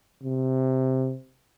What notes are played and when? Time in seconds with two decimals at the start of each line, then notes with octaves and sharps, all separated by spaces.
0.23 C3